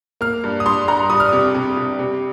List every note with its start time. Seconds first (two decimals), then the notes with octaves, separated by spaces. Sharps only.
0.21 A#3 F6
0.44 G2
0.60 D#6
0.66 G2 C6
0.88 G2 A#5
1.10 G3 D#6
1.20 F6
1.29 C3 D#6
1.54 C3
1.77 C3
1.99 C3